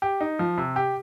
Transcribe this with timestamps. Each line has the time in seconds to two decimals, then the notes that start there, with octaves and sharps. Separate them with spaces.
0.02 G4
0.21 D#4
0.39 F3
0.58 C3
0.76 G4